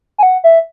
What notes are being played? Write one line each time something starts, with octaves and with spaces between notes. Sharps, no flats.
G#5
F#5
E5